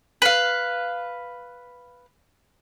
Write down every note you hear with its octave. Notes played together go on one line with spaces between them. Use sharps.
B4 F5